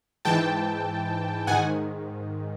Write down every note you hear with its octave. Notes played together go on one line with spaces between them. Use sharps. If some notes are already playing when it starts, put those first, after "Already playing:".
G#2 E3 G5 A5
G#2 D#3 F#5 G#5